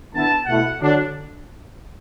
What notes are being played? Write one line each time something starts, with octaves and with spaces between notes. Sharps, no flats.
D3 B3 E4 A5
B2 A3 E4 F#5
D3 F#3 D4